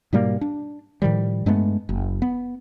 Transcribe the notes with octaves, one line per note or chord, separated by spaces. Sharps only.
G#2 B2 G3 A#3
D4
A2 D#3 F3 G3
G2 G#3 A3 B3
F#1
B3